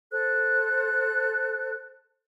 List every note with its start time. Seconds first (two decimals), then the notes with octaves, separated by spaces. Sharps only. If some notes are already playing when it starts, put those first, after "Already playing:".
0.11 A4 C5 F#6